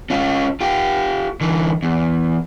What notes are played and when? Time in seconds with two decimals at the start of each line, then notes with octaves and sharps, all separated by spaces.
0.10 C#4 F4
0.61 F4 G4
1.41 D3 E3
1.83 E2